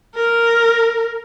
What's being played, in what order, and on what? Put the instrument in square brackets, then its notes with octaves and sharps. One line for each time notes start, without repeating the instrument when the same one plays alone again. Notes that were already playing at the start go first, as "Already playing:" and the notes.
[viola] A#4